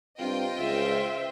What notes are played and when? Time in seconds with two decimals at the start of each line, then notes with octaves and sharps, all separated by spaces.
0.20 G2 C3 F4 D#5 G5
0.59 C#2 C5 E5